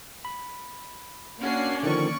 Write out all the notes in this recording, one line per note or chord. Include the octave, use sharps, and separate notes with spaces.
B5
A#3 C#4 D4 F#4 C7
D3 D#3 F3 D5 C#6